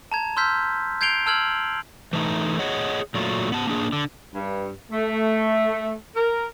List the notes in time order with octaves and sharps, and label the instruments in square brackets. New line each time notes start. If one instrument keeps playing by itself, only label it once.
[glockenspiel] A5 A#5 G#6
C6 E6 F6 G6 B6
G6 G#6 C7 D7 F7 G7
A5 E6 F6 G#6 F#7
[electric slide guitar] E3 A3 D#4
G#4 C#5 D#5 F#5
A#2 F#3 A3 F4
B3 A5
A#3 D4 G#4
D3
[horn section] G2
A3
A#4